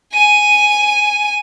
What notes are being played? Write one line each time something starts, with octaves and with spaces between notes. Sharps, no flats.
G#5 D#7